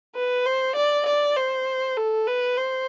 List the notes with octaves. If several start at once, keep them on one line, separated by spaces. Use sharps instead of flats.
B4
C5
D5
D5
C5
A4
B4
C5